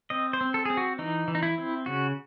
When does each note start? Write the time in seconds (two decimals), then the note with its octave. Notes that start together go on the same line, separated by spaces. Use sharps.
0.10 C4 D#5
0.33 C5
0.41 C4
0.54 A4
0.65 C4 G#4
0.77 F#4
0.99 E3 D#4
1.28 E3
1.35 D#4
1.43 E4
1.58 C4
1.86 C#3 F#4